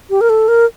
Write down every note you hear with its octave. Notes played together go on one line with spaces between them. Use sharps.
G4
A#4
A4
A#4